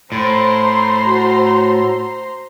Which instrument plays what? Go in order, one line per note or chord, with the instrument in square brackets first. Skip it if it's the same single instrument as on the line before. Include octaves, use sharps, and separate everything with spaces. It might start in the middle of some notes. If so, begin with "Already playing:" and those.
[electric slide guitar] A2 [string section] C5 A#5 C6
[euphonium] F#4